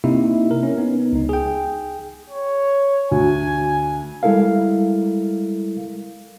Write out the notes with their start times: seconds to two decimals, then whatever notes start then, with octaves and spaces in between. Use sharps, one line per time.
0.04 C3 A#3 D#4 E4 E5
0.51 A#4
0.63 C#4
0.78 B3 D#4
1.13 C#2 D#4
1.29 G#4 G5
2.30 C#5
3.11 D2 G#5
4.23 G3 G#3 E4 A4 A#4 F5